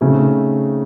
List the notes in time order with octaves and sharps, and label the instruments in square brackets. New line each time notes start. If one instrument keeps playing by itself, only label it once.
[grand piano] C#3 A3 C4 D#4 F#4